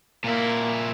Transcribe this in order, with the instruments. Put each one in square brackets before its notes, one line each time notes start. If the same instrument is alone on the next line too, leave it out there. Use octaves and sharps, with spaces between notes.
[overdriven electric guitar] A#2 E4 [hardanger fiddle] A#3